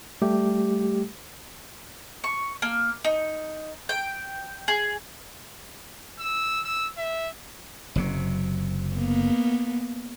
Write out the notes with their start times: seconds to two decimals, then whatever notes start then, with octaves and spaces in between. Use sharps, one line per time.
0.22 G3 A3 G4
2.24 C#6
2.62 A#3
3.05 D#4
3.89 G5
4.68 G#4
6.20 E6
6.66 E6
6.98 E5
7.95 F#1 C3 F#3
8.95 A#3 B3